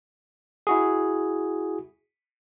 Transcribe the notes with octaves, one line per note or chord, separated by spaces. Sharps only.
E4 F#4 G#4